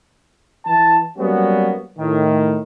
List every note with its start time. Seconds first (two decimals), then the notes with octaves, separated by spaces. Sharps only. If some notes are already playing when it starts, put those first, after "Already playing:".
0.66 E3 A5
1.18 F#3 G3 A#3 B3 C#4 F#4
1.99 A2 D#3